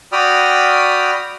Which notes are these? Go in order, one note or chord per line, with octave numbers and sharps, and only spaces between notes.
F#4 D5 G5 B5 D#6 F6